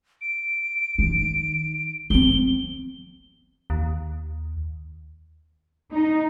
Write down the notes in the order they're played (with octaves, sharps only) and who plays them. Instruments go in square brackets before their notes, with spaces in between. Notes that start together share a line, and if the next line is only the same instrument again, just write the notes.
[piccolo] D7
[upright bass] D#3
[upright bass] F3 C4 [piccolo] G7
[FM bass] D#2
[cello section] D#4